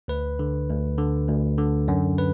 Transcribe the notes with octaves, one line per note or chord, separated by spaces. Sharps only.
D2 B4
D3
D2
D3
D2
D3
F#2
B4